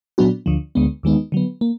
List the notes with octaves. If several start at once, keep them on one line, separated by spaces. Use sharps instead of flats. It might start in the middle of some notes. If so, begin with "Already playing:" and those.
A#2 F#3 B3 D4 F#4
D2 D3 F3
D2 D3 G#3 B3
D#2 D#3 G#3 B3 D#4
D3 F#3 B3
A#3